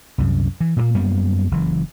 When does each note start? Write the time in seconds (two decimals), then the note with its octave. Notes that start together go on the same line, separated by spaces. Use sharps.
0.18 C2 F#2
0.61 E3
0.77 A#2 G3 A#3
0.94 F#2 G3 A#3 B3
1.51 F#1 E3